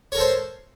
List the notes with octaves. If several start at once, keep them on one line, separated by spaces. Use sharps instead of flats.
A4 A#4 C5 C#5